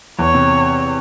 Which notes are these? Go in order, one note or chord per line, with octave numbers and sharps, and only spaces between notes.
E2 C#5
C3